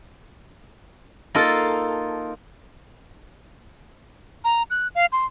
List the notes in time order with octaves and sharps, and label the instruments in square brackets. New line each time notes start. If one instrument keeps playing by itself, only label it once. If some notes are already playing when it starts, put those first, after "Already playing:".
[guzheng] A#3 D#4 F4 A4
[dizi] A#5
F#6
F5
C6